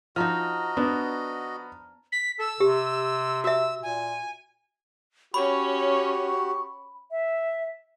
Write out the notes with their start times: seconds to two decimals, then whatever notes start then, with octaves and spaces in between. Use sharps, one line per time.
0.16 F3 D#4 F#4 D#5 A5 A#5 F6
0.77 B3 D4
2.12 B6
2.39 A4 E6
2.60 C3 G4
3.44 F#4 E5 E6
3.83 A#2 G#5
5.34 C#4 F#4 G4 C#5 B5 C#6
7.11 E5